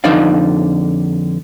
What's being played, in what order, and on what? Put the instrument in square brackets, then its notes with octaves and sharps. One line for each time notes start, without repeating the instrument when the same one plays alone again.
[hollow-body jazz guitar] F2 D3 D#4 C5 D5 F5